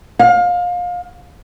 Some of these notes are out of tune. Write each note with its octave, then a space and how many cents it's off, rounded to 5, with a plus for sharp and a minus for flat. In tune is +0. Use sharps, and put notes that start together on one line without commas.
F5 +25